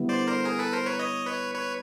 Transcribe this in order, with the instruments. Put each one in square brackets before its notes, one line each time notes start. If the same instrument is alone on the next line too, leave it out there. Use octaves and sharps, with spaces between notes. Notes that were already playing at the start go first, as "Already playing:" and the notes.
Already playing: [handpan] D3 G3 B3 E4
[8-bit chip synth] C5 D5
A#4 C5
G#4 A#4
A4 B4
A#4 C5
B4 C#5
C#5 D#5
B4 C#5
B4 C#5